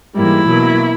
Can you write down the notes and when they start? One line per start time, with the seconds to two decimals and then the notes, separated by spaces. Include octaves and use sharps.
0.17 G#2 E3 G3 A#3 E4
0.47 B2 F#3 A#3